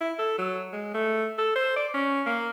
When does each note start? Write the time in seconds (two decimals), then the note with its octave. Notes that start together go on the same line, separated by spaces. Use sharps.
0.01 E4
0.19 A4
0.38 F#3
0.73 G#3
0.94 A3
1.38 A4
1.56 C5
1.76 D5
1.94 C#4
2.26 A#3